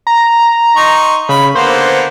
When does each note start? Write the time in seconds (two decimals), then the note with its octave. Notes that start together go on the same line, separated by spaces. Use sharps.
0.07 A#5
0.76 D#4 C6 C#6
1.29 C#3 B5
1.55 D3 A#3 B3 C5